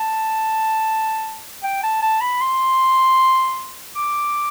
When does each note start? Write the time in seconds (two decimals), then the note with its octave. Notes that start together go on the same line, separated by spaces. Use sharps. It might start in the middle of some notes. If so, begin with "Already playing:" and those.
Already playing: A5
1.64 G5
1.83 A5
2.02 A5
2.21 B5
2.41 C6
3.96 D6